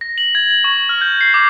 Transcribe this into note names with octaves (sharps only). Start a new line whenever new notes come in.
A#6
F#7
G#6
F#7
C#6
F6
G6
C7
D6